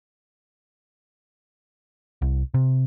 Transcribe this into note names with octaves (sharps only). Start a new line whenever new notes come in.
C2
C3